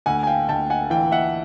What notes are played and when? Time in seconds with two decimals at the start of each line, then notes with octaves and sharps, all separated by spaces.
0.06 D2 F#5 G#5
0.23 G#5
0.27 F5 G5
0.49 D2 G5 A5
0.70 F#5 G#5
0.90 E3 F5 G5
1.12 E5 F#5